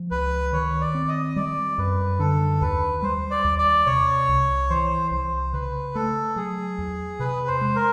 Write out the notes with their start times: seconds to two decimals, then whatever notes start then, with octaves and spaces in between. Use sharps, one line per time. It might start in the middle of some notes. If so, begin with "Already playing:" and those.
Already playing: F3
0.11 C#2 B4
0.53 D#3 C#5
0.81 D5
0.94 C4
1.08 D#5
1.36 G3 D5
1.78 F#2 B4
2.19 D3 A4
2.61 D#2 B4
3.02 G3 C5
3.31 D5
3.44 D#2
3.59 D5
3.86 C3 C#5
4.29 C2
4.70 E3 C5
5.11 C2 C5
5.53 C#3 B4
5.95 A3 A4
6.36 F#3 G#4
6.78 E2
7.19 C3 B4
7.47 C5
7.61 G#3
7.76 A#4